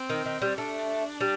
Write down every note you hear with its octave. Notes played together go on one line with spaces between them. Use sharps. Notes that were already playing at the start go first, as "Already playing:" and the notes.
Already playing: C4
D#3
D#3
G3
A3 D4
G3